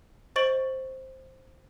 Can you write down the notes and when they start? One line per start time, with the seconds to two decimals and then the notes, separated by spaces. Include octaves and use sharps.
0.36 C5 D#5 C#6 A6 D7 F#7